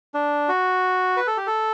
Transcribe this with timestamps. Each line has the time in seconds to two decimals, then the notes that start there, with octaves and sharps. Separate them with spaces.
0.14 D4
0.49 F#4
1.17 B4
1.27 A4
1.37 G4
1.47 A4